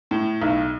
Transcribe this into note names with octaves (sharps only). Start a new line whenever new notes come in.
A2
B1